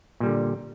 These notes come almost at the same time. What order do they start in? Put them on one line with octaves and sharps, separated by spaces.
A#2 G3 D3